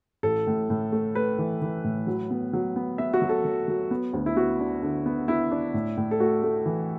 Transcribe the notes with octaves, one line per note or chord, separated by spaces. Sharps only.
A1 A4
A2
A2
A3
A3 B4
E3
E3
A2
F#3
B3
F#3
B3
B3 E5
F#4
F#3
A4
F#3
F#3
B3
D2
E4
B3 F#4
D4
D3
B3
B3 E4
D4
A2
A2
A4
A3 F#4
A3
E3